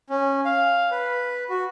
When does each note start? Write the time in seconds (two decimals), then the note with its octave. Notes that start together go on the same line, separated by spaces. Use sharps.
0.10 C#4
0.45 F5
0.91 B4
1.50 F#4